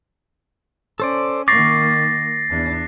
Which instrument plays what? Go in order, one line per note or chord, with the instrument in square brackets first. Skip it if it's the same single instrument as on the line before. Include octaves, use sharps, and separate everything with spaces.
[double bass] C#4 [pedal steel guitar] A4 C5 D5
[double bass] D#3 A#3 [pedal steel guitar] C#6 D6 [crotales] A6 A#6 C7
[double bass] E2 D4